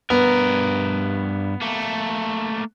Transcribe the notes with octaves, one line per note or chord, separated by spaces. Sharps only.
G2 B3 A#4
A3 A#3